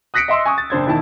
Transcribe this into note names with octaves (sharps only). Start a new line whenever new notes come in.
D#6 F#6 A#6 B6 C#7 D7
D#5 E5 C6 E6
G#5 C#6 D#6
A6
F#1 D4 C5 G#6
E1 D#3 E4 A5